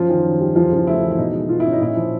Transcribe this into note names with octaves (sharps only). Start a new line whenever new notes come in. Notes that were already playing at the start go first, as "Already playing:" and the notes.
Already playing: F#2 F3 F4
D#3
F#2
G3
E2 F3 F4
C#3
F4
A3 E4
E3
E4
B2 D#4
G#3
B2 F4
C#4 E4
D#4
A#2 E4
F3